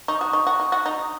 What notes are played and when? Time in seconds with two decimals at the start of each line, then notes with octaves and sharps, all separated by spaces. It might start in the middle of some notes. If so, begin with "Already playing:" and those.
0.08 D#4 C#6
0.19 F#4 D#6
0.31 D#4 C#6
0.47 F#4
0.60 D#4
0.72 F#4
0.86 D#4
1.02 D#6